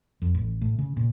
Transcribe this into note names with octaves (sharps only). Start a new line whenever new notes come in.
F2
A1
A2
C#3
A#2